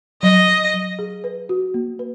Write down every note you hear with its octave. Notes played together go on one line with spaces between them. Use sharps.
F#3 D#5
F#3
F#3
G#4
B4
F#4
A#3
B4